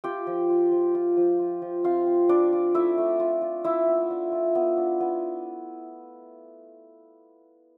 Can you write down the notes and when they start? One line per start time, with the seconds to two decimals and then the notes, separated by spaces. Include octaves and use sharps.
0.04 F4 G4 G5
0.27 F3
0.50 F4
0.72 F3
0.95 F4
1.17 F3
1.39 F4
1.62 F3
1.84 C4 F4 F5
2.07 C4
2.29 D4 F4 D5
2.53 F4
2.74 A3 E4 E5
2.98 A3
3.20 F4
3.42 F4
3.64 E4 F4 E5
3.87 B3
4.10 D4
4.32 F4
4.55 B3
4.77 D4
5.00 B3